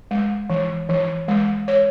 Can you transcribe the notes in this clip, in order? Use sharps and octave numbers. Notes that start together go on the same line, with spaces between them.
G#3
E3
E3
G#3
C#5